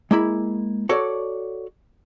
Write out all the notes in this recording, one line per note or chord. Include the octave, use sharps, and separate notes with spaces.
G#3 A#3 E4 B5
F#4 A4 C#5 D5